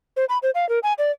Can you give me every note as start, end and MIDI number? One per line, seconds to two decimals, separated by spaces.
0.16 0.25 72
0.29 0.38 83
0.43 0.50 72
0.55 0.68 77
0.69 0.79 70
0.83 0.93 80
0.98 1.11 74